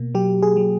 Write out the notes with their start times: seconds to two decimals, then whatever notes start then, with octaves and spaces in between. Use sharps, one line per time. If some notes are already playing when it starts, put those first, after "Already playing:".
Already playing: B2 A#3
0.15 F#3 G4
0.43 G#4
0.57 F#3